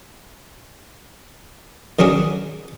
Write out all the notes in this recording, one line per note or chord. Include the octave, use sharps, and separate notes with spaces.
D#3 F#3 C#4 D4 G#4